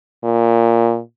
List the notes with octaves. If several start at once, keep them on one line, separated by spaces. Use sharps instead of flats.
A#2